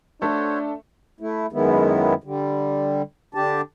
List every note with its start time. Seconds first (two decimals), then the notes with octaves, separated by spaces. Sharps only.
0.22 A3 D4 F#4 A4 C5 C#5
1.20 A3 E4
1.53 F#2 D#3 G#3 B3 E4
2.24 D3 G3
3.35 D3 D4 G4 A5